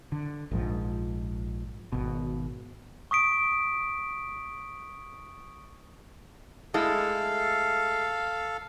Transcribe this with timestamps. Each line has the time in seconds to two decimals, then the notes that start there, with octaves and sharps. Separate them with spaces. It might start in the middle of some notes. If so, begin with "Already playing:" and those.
0.12 D3
0.51 A#1 G#2 F3
1.92 G#1 B2
3.11 C#6 D#6 B6 D7
6.74 G#3 A3 E4 A4 F5